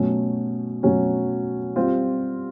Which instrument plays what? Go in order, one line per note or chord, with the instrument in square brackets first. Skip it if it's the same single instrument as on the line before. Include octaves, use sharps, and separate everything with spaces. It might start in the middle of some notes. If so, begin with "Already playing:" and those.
Already playing: [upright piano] B2 F#3 A3 C#4
B2 F#3 A3 C#4
G3 C4 F4